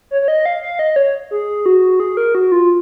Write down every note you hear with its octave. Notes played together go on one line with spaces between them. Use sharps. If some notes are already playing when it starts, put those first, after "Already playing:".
C#5
C#5
D#5
F5
F5
D#5
C#5
G#4
F#4
G#4
A#4
F#4
F4